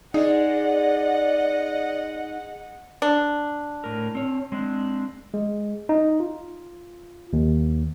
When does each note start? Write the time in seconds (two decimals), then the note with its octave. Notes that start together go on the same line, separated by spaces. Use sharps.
0.14 G#3 D#4 G#4 D5 D#5 F#5
3.02 D4
3.84 A2 A#4
4.15 C4 C#5
4.52 G#3 C4 D4
5.34 G#3
5.89 D#4
6.20 F4
7.33 D#2